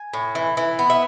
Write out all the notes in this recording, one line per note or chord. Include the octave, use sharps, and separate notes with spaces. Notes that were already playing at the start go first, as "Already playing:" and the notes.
Already playing: G#5
A2
E3
E3
B3
E5